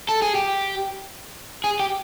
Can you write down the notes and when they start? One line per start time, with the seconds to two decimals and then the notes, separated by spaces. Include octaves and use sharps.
0.09 A4
0.22 G#4
0.35 G4
1.64 G#4
1.80 G4